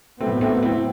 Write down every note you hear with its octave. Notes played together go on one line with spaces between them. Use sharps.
A2 F#3 A3 B3 C4
A3 C4
C4 E4